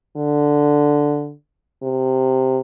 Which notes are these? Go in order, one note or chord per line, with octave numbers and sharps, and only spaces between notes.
D3
C3